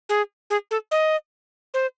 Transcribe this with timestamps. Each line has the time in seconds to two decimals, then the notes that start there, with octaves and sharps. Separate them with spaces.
0.09 G#4
0.50 G#4
0.71 A4
0.91 D#5
1.74 C5